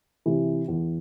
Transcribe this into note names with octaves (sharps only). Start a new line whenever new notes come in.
C3 E3
E2